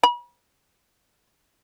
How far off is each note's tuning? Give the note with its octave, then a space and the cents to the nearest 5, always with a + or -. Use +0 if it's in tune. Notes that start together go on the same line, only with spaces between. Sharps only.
B5 -40